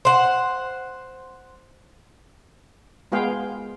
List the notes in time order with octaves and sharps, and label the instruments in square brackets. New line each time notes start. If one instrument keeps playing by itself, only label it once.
[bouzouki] C5 F#5
[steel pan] G#3 B3 F4 G#4 F5 G5